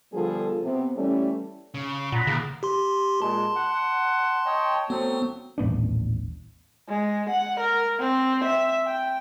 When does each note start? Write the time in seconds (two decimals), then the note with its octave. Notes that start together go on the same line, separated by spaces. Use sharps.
0.12 D3 F3 G3 B3 G#4 A4
0.63 C3 B3
0.96 E3 G3 A3 C#4
1.74 C#3
2.12 A#2 F#5 A#5 B5
2.27 D#2 C#3
2.63 G4 C6
3.22 A#2 G#3 A5 C6
3.56 F#5
4.45 C#5 D#5 G5
4.90 F#3 A3 B3 C4
5.58 D#1 A1 B3 D4
6.89 G#3
7.30 F#5
7.60 A#4
8.00 C4
8.44 E5
8.86 G5